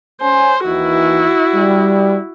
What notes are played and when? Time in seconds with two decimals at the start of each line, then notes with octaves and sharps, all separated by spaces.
0.21 C#4 C5 G#5
0.66 D#2 D#3 E3 E4 F#4
1.55 G3